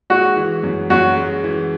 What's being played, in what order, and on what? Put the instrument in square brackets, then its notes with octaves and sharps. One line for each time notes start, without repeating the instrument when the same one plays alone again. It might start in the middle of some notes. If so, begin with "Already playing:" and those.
[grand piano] G#3 [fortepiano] F#4
[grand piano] E3
F#2
[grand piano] F#2 [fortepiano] F#4
[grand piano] G#3
E3